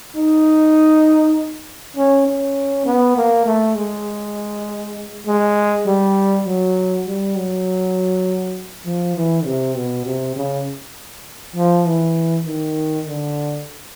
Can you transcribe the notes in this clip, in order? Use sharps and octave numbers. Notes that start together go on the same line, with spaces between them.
D#4
C#4
C#4
B3
A#3
A3
G#3
G#3
G3
F#3
G3
F#3
F3
E3
C3
B2
C3
C#3
F3
E3
D#3
D3